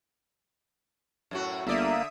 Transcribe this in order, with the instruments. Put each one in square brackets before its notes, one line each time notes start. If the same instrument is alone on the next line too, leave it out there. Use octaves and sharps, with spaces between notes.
[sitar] F#2 A2 F#4
[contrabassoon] G1 [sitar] D3 D5 [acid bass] A#3 [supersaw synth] E5 D#6